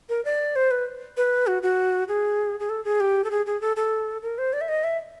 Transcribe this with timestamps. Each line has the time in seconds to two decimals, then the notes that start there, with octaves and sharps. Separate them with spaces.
0.09 A#4
0.25 D5
0.56 C5
0.71 B4
1.17 B4
1.47 F#4
1.63 F#4
2.08 G#4
2.60 G#4
2.69 A4
2.85 G#4
3.00 G4
3.24 A4
3.31 G#4
3.46 G#4
3.61 A4
3.76 A4
4.22 A#4
4.38 C5
4.53 D5
4.61 E5
4.69 D#5
4.84 E5